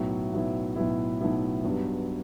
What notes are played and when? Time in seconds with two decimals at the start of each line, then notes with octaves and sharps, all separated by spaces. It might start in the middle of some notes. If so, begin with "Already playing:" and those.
Already playing: B1 A2 F#3 B3 E4
0.33 B1 A2 F#3 B3 E4
0.76 B1 A2 F#3 B3 E4
1.20 B1 A2 F#3 B3 E4
1.64 G2 F#3 B3